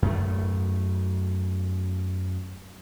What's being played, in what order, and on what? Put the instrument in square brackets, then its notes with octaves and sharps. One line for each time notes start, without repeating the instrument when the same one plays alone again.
[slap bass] F#2 A3